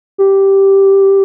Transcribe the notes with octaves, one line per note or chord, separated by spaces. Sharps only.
G4